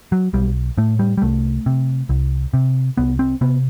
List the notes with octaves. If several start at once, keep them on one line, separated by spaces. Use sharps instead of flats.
F#3
B1 G3
A2 A3
G3
G3
C2 A3
C3
C2
C3
C2 B3
C4
C3 B3